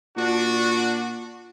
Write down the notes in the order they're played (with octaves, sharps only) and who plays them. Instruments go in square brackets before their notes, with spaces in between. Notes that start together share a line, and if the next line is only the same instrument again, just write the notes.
[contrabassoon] A#2 [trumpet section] D4 F#4